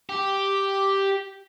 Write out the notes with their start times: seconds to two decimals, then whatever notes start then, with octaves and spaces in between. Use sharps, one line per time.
0.09 G4